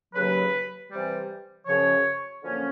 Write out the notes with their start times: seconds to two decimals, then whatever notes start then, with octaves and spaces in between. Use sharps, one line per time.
0.14 D#2 C#3 F#3 B4
0.90 C3 E3 G3
1.66 F#2 C#3 F3 C#5
2.42 F#2 D3 F3 A#3 C#4